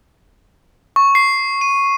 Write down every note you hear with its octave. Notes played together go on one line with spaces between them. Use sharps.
C#6
C7
D#7